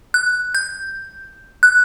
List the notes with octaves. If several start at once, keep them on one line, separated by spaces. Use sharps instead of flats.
F#6
G6
F#6